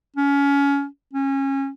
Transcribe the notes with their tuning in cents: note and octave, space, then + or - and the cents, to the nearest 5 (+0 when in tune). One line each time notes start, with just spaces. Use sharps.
C#4 +25
C#4 -25